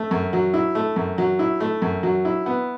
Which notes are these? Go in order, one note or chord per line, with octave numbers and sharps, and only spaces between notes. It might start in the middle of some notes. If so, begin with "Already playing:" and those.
Already playing: A3
F#2
F#3
E4
A3
F#2
F#3
E4
A3
F#2
F#3
E4
B3